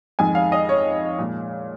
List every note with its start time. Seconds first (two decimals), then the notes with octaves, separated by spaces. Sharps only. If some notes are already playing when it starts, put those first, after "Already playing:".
0.19 F2 D#3 G#3 G#5
0.35 F5
0.52 D#5
0.69 C#5
1.19 A#2 F3 G#3